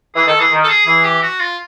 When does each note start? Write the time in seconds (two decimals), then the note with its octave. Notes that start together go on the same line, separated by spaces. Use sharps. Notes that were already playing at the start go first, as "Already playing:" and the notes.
0.15 E3 G#4
0.27 D#3 A4
0.39 E3 G#4
0.51 D#3
0.64 A4
0.69 G#4
0.86 E3 G#4
1.04 G4
1.22 F#4
1.40 F4